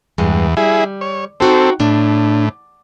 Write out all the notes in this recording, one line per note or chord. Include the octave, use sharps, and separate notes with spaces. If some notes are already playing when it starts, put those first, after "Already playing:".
E2 G2 G#3
G3 E4 G#4
C#5
C4 D#4 F#4 A4 G5
A2 D4